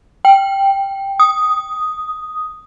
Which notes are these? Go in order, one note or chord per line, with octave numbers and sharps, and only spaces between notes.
G5
D#6